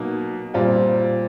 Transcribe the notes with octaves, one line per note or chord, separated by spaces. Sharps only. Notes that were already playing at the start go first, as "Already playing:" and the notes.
Already playing: B2 F#3 A#3 D#4 F#4
A#2 G3 C4 F4